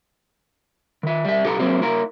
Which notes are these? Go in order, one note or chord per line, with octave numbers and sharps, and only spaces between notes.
D#3 E5
G3 E5
B1 G4 A4 A5 A#5
F#3 A#3 C4 E4
A#3 E4 A#4